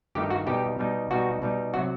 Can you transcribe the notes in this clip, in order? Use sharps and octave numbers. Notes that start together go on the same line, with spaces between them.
G2 D#3 A3 D#4 G4
F#4
B2 G3 D#4 G4
B2 G3 D#4
B2 G3 D#4 F#4
B2 G3 D#4
C3 F#3 F#4